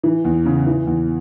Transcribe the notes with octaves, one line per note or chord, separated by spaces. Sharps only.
E3
E2
C#3
E3
E2